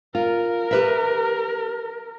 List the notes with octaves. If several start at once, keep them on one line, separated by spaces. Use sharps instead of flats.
F4 A#4
G4 B4 E5